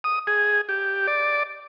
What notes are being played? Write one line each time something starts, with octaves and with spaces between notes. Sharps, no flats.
D#6
G#4
G4
D5